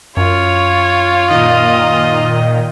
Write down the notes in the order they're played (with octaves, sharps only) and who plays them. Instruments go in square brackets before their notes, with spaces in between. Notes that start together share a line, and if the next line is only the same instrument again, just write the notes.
[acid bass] F#2 [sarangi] F4 [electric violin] C#5
[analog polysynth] A#2 D#3 [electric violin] D#5